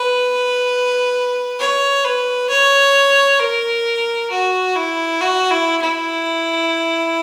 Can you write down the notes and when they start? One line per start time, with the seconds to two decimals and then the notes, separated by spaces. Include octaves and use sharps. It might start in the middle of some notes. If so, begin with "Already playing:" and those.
Already playing: B4
1.59 C#5
2.04 B4
2.49 C#5
3.40 A#4
4.31 F#4
4.76 E4
5.21 F#4
5.51 E4
5.82 E4